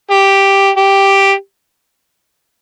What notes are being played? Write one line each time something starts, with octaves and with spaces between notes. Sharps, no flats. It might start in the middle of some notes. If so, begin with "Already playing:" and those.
G4
G4